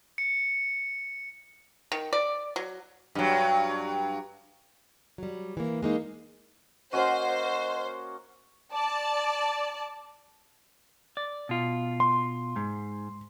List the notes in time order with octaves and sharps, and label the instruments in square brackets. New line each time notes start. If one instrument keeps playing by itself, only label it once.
[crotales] C#7
[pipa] D#3
D5
F#3
[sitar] G2 F#3
[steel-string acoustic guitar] F#3 G3
E3 A#3
G#3 A#3 D#4
[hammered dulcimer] A#3 C#4 F#4 [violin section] C5 [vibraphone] D#5 F#5
[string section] D5 A5
[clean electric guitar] D5
B2 F4
[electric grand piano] C6
[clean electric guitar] G#2